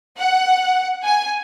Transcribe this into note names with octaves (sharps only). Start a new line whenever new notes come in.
F#5
G#5